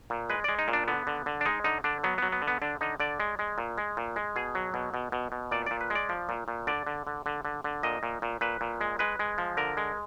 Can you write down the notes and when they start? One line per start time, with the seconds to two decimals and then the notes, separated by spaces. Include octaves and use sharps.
0.10 A#2
0.29 G#3 B4
0.44 G#3 D5
0.59 D#4
0.68 A#2
0.73 D4
0.88 D3 B3
1.07 D3
1.26 D3
1.41 D4
1.46 G#3 D#4
1.64 D3 D#4
1.84 D3 D4
2.04 F#3 B3
2.18 F#3 B3
2.32 B3
2.42 D3
2.48 B3
2.62 D3 D4
2.81 D3 D#4
3.00 D3 D5
3.20 G#3
3.39 G#3
3.58 A#2
3.78 G#3
3.97 A#2
4.16 G#3
4.36 B2 G#4
4.55 F#3
4.74 B2
4.94 B2
5.12 B2
5.32 B2
5.51 A#2 D5
5.66 A#2 D5
5.81 B4
5.90 G#3
5.95 D5
6.09 F3
6.29 A#2
6.48 A#2
6.67 D3 D5
6.87 D3
7.07 D3
7.26 D3
7.45 D3
7.64 D3
7.83 A#2 D#5
8.03 A#2
8.22 A#2
8.41 A#2 B4
8.61 A#2
8.81 G#3
8.99 G#3 B4
9.19 G#3
9.38 F3
9.57 D3 A#4
9.77 G#3